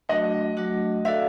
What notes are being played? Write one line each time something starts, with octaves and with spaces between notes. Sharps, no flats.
F#3 A3 D4 F#4 D#5
F#3 A3 D4 F#4
D4 F#4 A4 D5 E5 F5